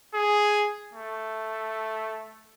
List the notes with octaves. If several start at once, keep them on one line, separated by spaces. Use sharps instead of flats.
G#4
A3